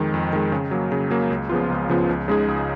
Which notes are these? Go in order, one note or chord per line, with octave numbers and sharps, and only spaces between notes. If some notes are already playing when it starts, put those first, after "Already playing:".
Already playing: F2 D#3 G#3
F2
D#3 G#3
C#3
F#3 A#3
C#3
F#3 A#3
C#2
C#3 F3 B3 F4
C#2
C#3 F3 B3 F4
C#2
C#3 G#3 D#4 G#4
C#2